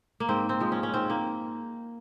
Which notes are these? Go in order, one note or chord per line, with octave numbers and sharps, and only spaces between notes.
A#3
G#2 C4
C4
F3 G#3
C#4
C#4
G#2 C4
A#3